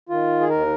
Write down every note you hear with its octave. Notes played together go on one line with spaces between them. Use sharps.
D#3 F4
G#4
D#2 A#4